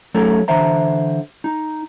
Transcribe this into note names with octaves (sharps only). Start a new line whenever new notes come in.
F#3 A3 C#4 D#4 A4
D3 E3 C5 E5 A#5
D#4